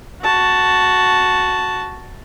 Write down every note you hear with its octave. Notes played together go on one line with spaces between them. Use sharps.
F#4 A5